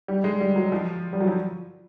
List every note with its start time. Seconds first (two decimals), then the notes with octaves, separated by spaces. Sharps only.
0.08 G3
0.24 G#3
0.40 G3
0.56 F#3
0.72 F3
1.13 G3
1.20 F#3
1.27 F3